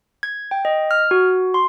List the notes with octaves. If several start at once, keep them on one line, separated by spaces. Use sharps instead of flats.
G#6
G5
D#5
F6
F#4
C6